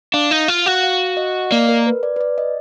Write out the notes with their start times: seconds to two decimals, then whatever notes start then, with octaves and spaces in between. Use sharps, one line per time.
0.13 D4 F5
0.31 D#4
0.48 F4 F5
0.66 F#4
0.83 F5
1.17 D#5
1.47 D#5
1.51 A#3 D5
1.69 A#4
1.87 B4
2.03 D5
2.16 B4
2.21 D5
2.38 D#5